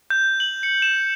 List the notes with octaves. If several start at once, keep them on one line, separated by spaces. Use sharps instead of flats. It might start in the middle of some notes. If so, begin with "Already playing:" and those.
G6
F#7
C#7
E7